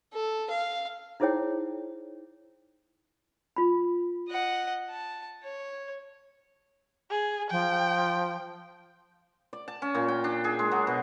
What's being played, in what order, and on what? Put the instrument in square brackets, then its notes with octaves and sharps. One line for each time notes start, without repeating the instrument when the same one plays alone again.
[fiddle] A4
F5
[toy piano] D#4 E4 G#4 C5 C#5 G5
F4 B5
[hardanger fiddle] D#5 F#5
A5
C#5
[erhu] G#4
[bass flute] F3 [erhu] G5
[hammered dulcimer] D5
A5
C#4
A#2
G5
D4
G#4
G#3
F#3
B2